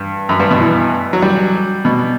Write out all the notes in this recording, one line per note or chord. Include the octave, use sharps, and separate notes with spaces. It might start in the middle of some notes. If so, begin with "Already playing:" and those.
Already playing: G2
F#2
G2
B2
E3
F#3
G3
B2